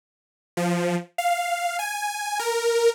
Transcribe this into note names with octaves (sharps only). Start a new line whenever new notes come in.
F3
F5
G#5
A#4